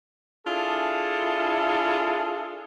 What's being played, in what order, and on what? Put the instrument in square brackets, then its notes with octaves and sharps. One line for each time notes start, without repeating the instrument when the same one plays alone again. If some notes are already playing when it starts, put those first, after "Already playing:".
[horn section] D4 E4 F4 G#4 A4